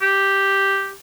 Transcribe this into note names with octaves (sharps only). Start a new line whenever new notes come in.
G4